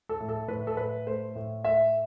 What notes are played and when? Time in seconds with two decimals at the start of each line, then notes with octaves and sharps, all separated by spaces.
0.09 A4
0.20 A2
0.29 A4
0.48 A2 B4
0.67 A4
0.77 A2 B4
1.07 A3 C5
1.35 A2
1.64 A3 E5